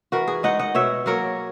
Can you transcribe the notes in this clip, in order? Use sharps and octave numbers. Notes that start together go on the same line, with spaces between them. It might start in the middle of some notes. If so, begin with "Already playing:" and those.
E3 F#4 A#4
G#4
G#3 D#4 D#5 F#5
D#5 F#5
B2 C#5 E5
F#3 A#3 A#4 C#5